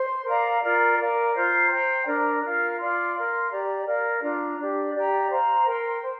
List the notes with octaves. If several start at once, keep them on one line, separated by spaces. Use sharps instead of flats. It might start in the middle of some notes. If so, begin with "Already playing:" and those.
Already playing: C5 C6
A#4 D5 F5 A#5
F4 A#4 D5 A#5
A#4 D5 F5
F4 C5 A#5
C5 G5 A#5
D4 A#4 D5 A#5
F4 A#4 F5
F4 D5 F5 C6
A#4 F5 C6
G4 D5 A#5
A#4 D5 F5
D4 F4 D5 A#5
D4 G4 D5
G4 D5 G5 A#5
C5 F5 A#5
A#4 G5 C6
C5